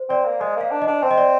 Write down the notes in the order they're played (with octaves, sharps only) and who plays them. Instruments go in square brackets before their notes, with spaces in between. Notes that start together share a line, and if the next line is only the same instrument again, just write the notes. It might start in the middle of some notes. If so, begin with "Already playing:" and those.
Already playing: [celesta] C5
[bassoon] C4 [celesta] D5
[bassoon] A#3
[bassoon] G#3 [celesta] D#5
[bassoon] A#3 [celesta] F5
[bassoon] D4
[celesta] D#5
[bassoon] D4
[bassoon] C4 [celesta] C5
[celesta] D#5
D5